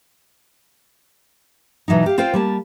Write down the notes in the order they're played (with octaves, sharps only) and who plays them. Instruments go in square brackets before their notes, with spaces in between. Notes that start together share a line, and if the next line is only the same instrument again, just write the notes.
[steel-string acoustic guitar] B2 E3 F#3 D#4
G4 F5
C4 F4 C5 F5 G5
G3 A#3 A5